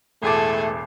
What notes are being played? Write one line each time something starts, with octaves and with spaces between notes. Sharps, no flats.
E1 A1 A3 G#4 A4 D6